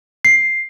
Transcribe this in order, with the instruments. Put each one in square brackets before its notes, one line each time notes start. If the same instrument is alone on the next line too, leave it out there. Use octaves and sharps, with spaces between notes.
[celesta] C7